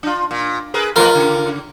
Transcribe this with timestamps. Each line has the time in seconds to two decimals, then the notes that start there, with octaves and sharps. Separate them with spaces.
0.03 D4 F4
0.31 A#2
0.74 G#4 A#4 B4
0.96 F2 A3 F4 A#4 B4
1.15 C#3